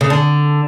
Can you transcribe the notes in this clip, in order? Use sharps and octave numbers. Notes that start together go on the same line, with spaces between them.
C#3
D3